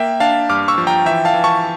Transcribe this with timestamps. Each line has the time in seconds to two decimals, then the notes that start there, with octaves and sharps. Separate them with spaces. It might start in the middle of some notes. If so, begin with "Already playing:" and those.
Already playing: A#3 E5 G5
0.20 D4 F5 A5
0.49 G2 D6 F6
0.68 C#6 E6
0.78 F3
0.87 G5 A#5
1.06 E3 E5 G5
1.25 F5 A5
1.34 E3
1.44 A5 C#6